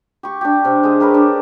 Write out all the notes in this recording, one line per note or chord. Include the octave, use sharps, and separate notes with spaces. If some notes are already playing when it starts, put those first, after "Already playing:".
G4 C#6
D4 G4
C3
G#3 G#4
G4 A#4 B4 C#5
D4